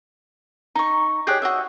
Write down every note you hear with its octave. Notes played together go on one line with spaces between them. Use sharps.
D#4 A#5 C#6
G4 G#4 C#5 D#5 F#6 G6
F#4 D#5 E5